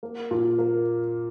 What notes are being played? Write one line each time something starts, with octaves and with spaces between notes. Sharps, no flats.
A#3
A#2
A#3